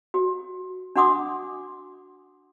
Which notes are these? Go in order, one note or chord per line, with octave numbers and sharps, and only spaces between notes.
F#4
D4 F#4 F#5 C6 D6 D#6